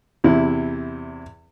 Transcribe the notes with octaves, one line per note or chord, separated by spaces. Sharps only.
E2 C3 E4